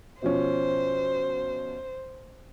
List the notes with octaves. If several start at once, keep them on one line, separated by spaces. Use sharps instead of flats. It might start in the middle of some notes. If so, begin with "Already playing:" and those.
B2 F3 C#4 C5